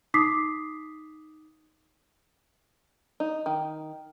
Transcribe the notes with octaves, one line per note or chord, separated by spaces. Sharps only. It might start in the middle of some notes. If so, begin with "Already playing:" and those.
D#4 D6 D#6 B6 C7
D#4
D#3